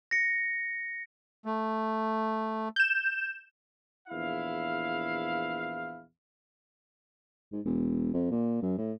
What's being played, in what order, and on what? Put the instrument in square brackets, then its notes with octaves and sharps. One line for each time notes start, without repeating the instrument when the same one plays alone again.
[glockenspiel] A#6 C#7
[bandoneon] A3
[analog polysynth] G6 E7
[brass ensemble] A#1 E2 E4 F5
[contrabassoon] G#2
E1
F2
A#2
F#2
A2